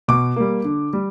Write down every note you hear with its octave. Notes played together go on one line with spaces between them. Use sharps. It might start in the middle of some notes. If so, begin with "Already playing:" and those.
B2 D6
G3 A#3
D3
G3